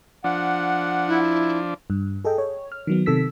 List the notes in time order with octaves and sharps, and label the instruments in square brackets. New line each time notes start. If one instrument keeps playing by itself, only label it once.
[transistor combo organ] F3 D4 [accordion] F#5
[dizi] E4
[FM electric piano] G2
G#4 A4 D#5 G5
C#5
F6
D#3 F#3 B3
C3 D#3 A4 E6 B6